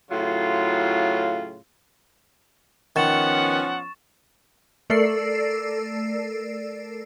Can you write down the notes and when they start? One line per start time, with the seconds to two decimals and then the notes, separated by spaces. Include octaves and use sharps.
0.11 A2 C#3 F#3 F4
2.96 D#3 F3 B3 C#4 F#5 C#6 A6 E7
4.90 A3 A4 A#4 D5 E6 C7